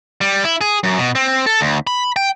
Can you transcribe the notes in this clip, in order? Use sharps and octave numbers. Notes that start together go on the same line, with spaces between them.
G3
E4
G#4
F#2
B2
C4
A4
D2
B5
G5